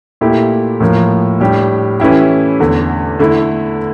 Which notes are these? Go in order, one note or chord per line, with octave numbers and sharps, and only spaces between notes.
A#2 A3 E4 G4
A2 F3 A#3
A2 G3 D4 G4
E3 A3 C#4 E4 G4
E2 D3 A3
D3 A3 E4